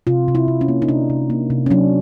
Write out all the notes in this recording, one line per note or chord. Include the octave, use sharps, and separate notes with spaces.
C3 F4
C3
E4
C3
C#4
A#3
D#4
C3 D4
C3
A#3
C3
C#4
F#3 D4